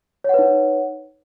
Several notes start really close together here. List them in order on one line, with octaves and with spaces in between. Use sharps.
C#5 F#5 B4 D#4